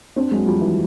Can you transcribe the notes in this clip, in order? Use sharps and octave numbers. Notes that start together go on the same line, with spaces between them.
C4 D4
F#3 G#3
F3 G3
E3 F#3